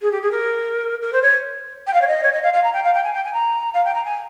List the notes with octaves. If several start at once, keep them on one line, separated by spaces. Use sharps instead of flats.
G#4
G4
G#4
A#4
A#4
C5
C#5
G5
F5
C#5
D#5
C#5
D#5
F5
F5
A#5
G5
F5
G5
G#5
G5
G#5
A#5
F5
G5
A#5
G#5